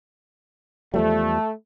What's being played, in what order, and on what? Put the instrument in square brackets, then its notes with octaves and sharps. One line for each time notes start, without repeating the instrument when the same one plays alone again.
[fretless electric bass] E2 F3 G3 [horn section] A3